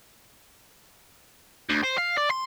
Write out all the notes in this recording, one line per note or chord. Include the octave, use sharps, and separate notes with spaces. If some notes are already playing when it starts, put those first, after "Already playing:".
D2
C5
F5
D5
C6